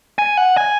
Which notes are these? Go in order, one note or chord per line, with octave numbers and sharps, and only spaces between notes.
G#5
F#5
G#5